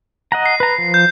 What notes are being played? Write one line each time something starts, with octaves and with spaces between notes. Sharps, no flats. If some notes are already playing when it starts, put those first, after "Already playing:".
D#5 F#5 A#5
C7
B4 A#5
F3
G6